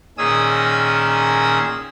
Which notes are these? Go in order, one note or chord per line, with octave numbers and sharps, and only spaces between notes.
A#2 D#3 C#4 G#4 D#6 E6